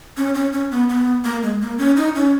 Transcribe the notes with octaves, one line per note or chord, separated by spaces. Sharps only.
C#4
C#4
C#4
B3
B3
A#3
G#3
A#3
C#4
D#4
C#4